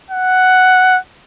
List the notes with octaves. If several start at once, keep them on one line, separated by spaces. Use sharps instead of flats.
F#5